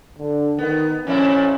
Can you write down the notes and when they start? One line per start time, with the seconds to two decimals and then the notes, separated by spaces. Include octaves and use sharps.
0.18 D3
0.58 D#3 B3
1.07 F2 A#2 C#4 E4